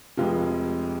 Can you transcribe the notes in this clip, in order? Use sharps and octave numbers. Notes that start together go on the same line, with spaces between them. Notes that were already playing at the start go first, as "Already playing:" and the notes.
F1 F2 C3 F3 G#3 F4